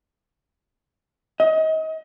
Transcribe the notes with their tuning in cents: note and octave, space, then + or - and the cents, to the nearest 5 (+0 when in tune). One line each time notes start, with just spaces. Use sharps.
D#5 +30